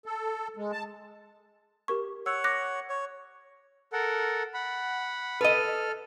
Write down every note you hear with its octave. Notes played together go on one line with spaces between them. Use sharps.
A4
G#3
A5
G4 A#4 C#6
C#5 F#5 E6
D6 F#6 A#6
C#5
A4 A#4 F#5
F#5 B5
A4 B4 D#5 F6